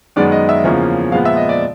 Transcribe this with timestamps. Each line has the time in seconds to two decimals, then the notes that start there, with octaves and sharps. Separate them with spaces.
0.16 F#2 D#3 G#3 B3 D5
0.32 D#5
0.49 E5
0.64 E2 C#3 F3 A#3 C#4
1.12 A#2 F3 G#3 B3 F5
1.25 E5
1.37 D#5
1.49 D5